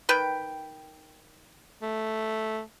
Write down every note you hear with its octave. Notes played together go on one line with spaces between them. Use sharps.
D#3 B4 G5
A3